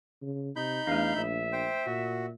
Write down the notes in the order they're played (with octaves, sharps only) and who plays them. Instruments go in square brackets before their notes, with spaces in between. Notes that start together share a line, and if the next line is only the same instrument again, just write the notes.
[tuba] C#3
[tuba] C3 [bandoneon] D#4 B5 G6
[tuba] E2 [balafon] A3 D4 [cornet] F5
[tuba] A#1 [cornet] E5
[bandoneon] C5 G5
[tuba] A#2 [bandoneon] F#4